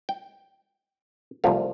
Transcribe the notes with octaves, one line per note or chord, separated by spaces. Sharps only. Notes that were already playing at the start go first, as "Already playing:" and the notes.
G5
C2 C3 F3 A3 F5